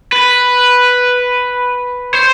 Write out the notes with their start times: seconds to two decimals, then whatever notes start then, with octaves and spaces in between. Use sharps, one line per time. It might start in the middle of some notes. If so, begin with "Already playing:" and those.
0.12 B4
2.13 C5